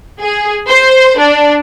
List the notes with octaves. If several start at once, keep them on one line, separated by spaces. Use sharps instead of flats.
G#4
C5
D4